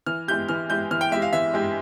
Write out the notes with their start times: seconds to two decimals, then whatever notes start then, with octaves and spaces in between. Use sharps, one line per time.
0.06 E3 F6
0.28 G#3 E4 G4 G6
0.48 E3 F6
0.70 G#3 E4 G4 G6
0.91 E3 F6
1.01 G5
1.12 G#3 E4 G4 E5
1.22 F5
1.33 E3 E5
1.54 G#3 E4 G4